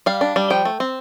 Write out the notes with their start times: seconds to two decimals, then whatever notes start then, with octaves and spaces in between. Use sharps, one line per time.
0.06 G3 F5
0.21 D4
0.36 G3
0.50 F3 G5
0.65 A3
0.80 C4